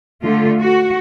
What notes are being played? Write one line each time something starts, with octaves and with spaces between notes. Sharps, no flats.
D3 A3 F4
F#4